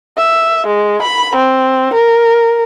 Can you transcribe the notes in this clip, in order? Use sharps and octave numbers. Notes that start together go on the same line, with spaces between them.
E5
G#3
B5
C4
A#4